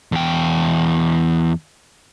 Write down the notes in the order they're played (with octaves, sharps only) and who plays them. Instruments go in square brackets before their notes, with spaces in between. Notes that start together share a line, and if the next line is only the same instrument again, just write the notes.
[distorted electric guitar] E2 G5